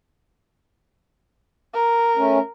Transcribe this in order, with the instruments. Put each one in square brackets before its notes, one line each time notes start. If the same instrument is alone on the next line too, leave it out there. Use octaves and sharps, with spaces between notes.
[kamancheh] A#4
[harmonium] A3 C#4